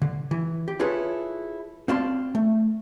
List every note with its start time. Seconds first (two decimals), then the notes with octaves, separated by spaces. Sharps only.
0.02 D3
0.31 E3
0.68 G4
0.79 E4 F4 G#4 A4 B4 C#5
1.88 C4 F#4 D5 F5 A5 C6
2.35 A3